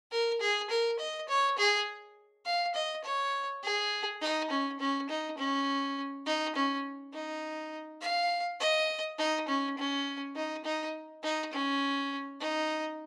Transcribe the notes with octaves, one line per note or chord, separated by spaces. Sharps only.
A#4
G#4
A#4
D#5
C#5
G#4
F5
D#5
C#5
G#4
D#4
C#4
C#4
D#4
C#4
D#4
C#4
D#4
F5
D#5
D#4
C#4
C#4
D#4
D#4
D#4
C#4
D#4